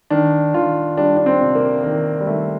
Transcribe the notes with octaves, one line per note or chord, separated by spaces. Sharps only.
D#3 D4
D#3 F4
G3 D4
D4
C4
C3
A#3
D#3 A#3
G3
D#3 A3